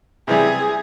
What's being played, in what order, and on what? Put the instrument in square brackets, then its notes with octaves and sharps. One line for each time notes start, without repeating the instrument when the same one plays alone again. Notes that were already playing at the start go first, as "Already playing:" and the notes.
[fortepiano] C3 E3 G3 [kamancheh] G#4